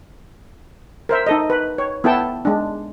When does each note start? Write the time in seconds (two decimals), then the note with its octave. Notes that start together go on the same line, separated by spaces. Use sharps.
1.09 A#4 C5 E5
1.27 D#4 A4 D#5
1.50 B4
1.78 C#5
2.04 B3 E4 A4 G5 A5
2.45 G#3 D4